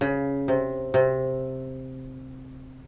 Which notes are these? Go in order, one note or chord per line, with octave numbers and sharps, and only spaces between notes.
C#3
C3
C3